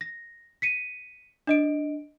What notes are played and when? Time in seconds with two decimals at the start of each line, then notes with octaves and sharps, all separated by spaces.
0.01 A#6
0.62 B6 C#7 D#7
1.47 D4 D#5 D7